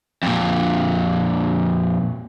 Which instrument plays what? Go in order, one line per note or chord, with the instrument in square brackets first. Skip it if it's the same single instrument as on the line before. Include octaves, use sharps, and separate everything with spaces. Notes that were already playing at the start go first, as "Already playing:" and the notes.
[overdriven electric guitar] F2 A#2